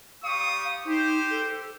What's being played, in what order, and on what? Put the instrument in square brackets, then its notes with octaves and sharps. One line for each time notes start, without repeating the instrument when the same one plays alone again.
[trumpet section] G3 C#6 D#6 [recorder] F5
[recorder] D#4 [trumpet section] G4 C5
[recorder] A4